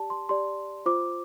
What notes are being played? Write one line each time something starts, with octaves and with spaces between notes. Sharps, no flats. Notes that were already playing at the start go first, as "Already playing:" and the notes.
Already playing: G4 D5 A5
C6
G4 D5 C6
F4 C5 D6